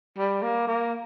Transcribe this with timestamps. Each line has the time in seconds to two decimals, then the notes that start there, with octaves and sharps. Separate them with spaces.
0.18 G3
0.42 A#3
0.67 A#3